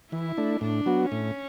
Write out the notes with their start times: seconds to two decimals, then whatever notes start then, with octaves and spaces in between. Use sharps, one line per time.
0.12 E3 E4
0.37 A3 D4
0.61 A2 D4
0.86 F#3 B3 F#4
1.11 A2 C#4